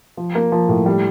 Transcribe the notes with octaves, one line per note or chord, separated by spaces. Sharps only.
F3
A#3
F3
A2
G3